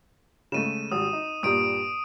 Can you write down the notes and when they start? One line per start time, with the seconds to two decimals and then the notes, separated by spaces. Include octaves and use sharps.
0.52 C#3 G#3 A3 D#7 E7
0.92 G#1 G3 D#6
1.13 D#4
1.43 G2 A#2 G3 D#6 D7